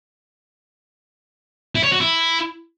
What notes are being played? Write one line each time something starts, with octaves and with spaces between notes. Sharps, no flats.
E4
C#5
F#4
E4